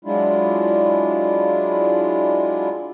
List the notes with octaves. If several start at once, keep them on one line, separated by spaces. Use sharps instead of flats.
F#3 G#3 D4 E4 F4